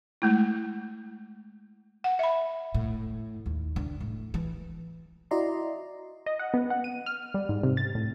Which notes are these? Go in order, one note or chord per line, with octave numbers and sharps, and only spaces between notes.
G#3 A3 E4
F#5
E5 B5
A2
D#2
D3
A2
E3
E4 F#4 D5 D#5 A#5 C6
D#5
F#5
B3
F#5
D#7
F6
G3
G#2
C3
A6
A2